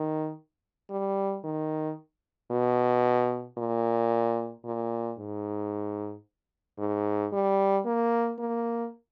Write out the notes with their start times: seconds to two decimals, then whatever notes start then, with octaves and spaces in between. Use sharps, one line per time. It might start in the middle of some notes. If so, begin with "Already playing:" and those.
Already playing: D#3
0.90 G3
1.44 D#3
2.51 B2
3.58 A#2
4.65 A#2
5.19 G#2
6.79 G#2
7.32 G3
7.86 A#3
8.39 A#3